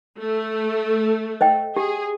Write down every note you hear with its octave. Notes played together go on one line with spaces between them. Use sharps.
A3
C5 D#5 G5
G4 G#4